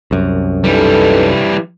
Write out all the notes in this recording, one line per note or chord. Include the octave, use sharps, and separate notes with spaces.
C2 F#2
E3 G3 D#4 A4 B4